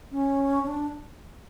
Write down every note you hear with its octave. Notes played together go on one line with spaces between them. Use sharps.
C#4
C#4
D4